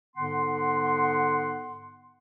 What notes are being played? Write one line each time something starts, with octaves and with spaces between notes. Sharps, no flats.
G#2 D3 B3 F#5 C6